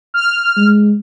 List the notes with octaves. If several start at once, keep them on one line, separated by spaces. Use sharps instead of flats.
F6
G#3